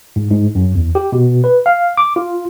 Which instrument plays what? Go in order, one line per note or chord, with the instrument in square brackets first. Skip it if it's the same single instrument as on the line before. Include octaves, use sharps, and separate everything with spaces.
[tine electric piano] G#2
G#2
F#2
E2
G4
B2
B4
F5
D6
F4